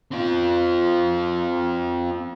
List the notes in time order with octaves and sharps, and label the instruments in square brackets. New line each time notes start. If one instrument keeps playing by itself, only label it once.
[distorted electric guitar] C4 F4